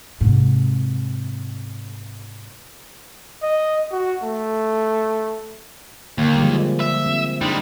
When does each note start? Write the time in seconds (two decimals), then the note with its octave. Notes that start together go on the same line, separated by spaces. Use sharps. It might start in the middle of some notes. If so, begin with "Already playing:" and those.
0.21 G#2 C3
3.43 D#5
3.92 F#4
4.24 A3
6.18 D#2 D3 A#3
6.36 F3 G3 G#3
6.80 E5
7.06 C4
7.41 G3 G#3 D4 D#4